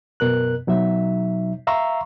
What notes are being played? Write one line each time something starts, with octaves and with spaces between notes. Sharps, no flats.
F#2 B2 A#4 F#6
B2 F#3 D#4 E5
E5 F5 A#5 C6 C#6 E6